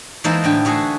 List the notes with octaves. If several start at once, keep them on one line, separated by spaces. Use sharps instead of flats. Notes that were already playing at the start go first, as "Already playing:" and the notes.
E3 G#3 A#3 D#4 A4 C5
A2 D3 G5
A3 F#4 G#4